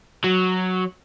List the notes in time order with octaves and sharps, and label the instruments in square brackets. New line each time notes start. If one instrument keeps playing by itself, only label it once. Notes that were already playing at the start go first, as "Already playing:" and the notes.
[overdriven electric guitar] F#3